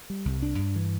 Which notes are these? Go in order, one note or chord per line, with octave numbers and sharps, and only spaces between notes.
G3
C2
D4
G2
E3